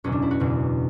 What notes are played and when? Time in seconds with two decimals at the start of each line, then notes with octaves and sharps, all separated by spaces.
0.04 F#1 E2 B2 F#3 C#4
0.12 D4
0.22 E4
0.31 F#4
0.40 F#1 E2 B2 F#3